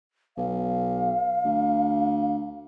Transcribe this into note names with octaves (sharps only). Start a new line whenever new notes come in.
B1 F5
D2